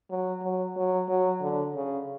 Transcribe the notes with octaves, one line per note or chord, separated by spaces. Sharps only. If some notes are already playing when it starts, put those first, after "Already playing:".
F#3
F#3
F#3
F#3
D3
C#3